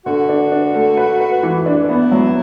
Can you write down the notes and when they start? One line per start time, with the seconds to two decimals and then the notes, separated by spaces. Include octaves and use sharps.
0.06 D3 F#4
0.29 D4
0.52 D4
0.74 A3
0.97 B4
1.20 B4
1.43 E3
1.66 D4
1.89 B3 E4
2.11 F#3